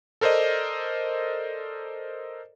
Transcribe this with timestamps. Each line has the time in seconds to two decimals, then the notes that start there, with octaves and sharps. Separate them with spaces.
0.21 A4 A#4 C5 D5 D#5